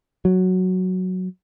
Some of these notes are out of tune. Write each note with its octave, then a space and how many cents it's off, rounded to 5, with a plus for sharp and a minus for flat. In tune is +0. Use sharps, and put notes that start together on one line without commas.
F#3 +0